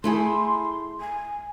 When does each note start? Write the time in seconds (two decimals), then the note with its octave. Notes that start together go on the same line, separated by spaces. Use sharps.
0.04 A3 E4 G#4 C6
1.01 G#5